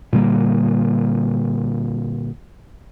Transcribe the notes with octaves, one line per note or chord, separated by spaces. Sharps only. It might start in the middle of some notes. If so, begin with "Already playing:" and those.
A#2 D3 G3 A#3